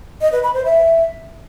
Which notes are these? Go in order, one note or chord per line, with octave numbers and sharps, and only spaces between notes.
D#5
B4
B5
C5
E5